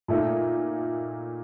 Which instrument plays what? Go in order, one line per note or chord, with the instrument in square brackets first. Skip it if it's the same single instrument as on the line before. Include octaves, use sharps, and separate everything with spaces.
[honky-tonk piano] A#2 A3 D#4